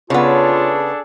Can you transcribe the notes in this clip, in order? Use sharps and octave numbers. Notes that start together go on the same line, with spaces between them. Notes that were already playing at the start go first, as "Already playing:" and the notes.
C#3 B3 D4 F4 G#4 A4 C#5